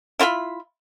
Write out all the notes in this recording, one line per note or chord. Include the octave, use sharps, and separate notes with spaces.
E4 F4 F5 B5